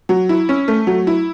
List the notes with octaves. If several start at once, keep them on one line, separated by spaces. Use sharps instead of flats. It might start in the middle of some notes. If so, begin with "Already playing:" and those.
F#3
E4
C#4
A3
F#3
E4